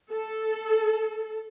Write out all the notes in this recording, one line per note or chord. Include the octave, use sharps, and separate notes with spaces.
A4